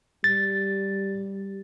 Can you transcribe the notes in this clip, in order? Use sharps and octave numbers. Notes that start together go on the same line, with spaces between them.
G3 A6